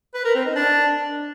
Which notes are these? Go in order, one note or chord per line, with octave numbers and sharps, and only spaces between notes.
B4
A#4
C4
D#4
D4